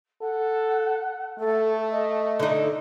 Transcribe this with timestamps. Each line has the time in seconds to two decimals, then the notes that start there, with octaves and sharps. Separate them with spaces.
0.21 A4 F#5
1.39 A3 A4
1.90 D#5
2.40 D3 D#4